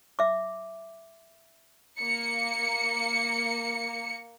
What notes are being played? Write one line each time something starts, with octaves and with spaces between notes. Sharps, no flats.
E5 D6
A#3 C#7